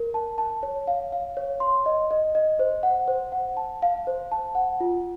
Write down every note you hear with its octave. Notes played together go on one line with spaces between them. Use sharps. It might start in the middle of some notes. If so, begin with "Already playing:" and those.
Already playing: A#4
A5
A5
C#5
F5
F5
C#5
C6
D#5
D#5
D#5
C5
F#5
C5
F#5
A5
F5
C5
A5
F#5
F4